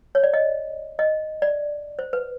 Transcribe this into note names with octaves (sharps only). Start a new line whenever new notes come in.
C#5
D5
D#5
D#5
D5
C5
B4